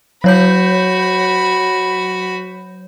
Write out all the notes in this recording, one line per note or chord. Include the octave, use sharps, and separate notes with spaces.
F#3 F#4 C#5 B5 G6